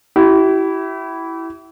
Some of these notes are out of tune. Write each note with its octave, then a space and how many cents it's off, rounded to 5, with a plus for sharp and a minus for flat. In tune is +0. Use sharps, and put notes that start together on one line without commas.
E4 +0 G4 -40